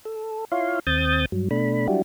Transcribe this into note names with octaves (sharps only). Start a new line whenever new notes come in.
A4
E4 F4 C#5 F5 C6
D#2 C4 D#6 G6 A6
G2 F#3
B2 A3 D4 B5
F#3 G3 D4 E4 F#4 G4